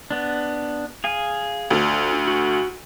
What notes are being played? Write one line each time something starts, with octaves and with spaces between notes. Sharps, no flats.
B3 D4
G#4 F5 G#5
D2 D4 F4
F#4